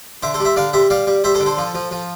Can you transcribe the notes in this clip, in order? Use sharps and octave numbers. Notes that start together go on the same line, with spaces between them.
D3 C5 E5
A4 C5
G3
C5 E5
D3 D5 F5
G3 C5 E5
G3 D5 F5
G3
G3 C5 E5
A4 C5
D3
A4 C5
F3
F3
F3